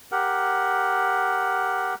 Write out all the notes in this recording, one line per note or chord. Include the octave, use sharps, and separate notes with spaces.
G4 A#4 F#5